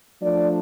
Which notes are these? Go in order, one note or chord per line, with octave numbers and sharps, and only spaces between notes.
F3 A3 D4 D5